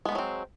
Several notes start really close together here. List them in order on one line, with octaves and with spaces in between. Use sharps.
G#3 B3 D#3 F#3 C4